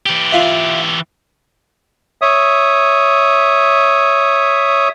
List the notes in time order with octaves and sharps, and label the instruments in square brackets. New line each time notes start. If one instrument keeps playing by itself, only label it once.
[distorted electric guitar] E3 G4
[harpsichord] F4 E5
[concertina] C#5 E5 D#6